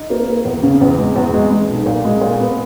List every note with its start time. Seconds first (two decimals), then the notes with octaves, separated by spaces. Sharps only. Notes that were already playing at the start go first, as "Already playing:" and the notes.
Already playing: D#4
0.10 A#3
0.28 A#3
0.45 E2
0.63 C#3
0.81 E2
0.98 G#3
1.16 E2
1.34 G#3
1.50 G#3
1.68 B1
1.86 A#2
2.05 G#3
2.21 A#2
2.39 B3